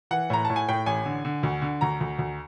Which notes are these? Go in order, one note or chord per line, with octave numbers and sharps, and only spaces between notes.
E3 F#5
A2 A#5
A2 A5
G#5
A2 G5
A1 G#5
D3
D3
D2
D3
D2 A#5
D2
D2